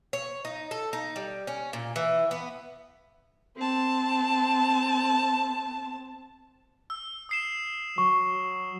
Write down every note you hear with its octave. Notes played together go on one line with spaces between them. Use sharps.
C#5
D#4
A4
D#4
G3
C#4
A#2
E3
B3
C4 A5
E6
D#6 C7 E7
F#3 C#6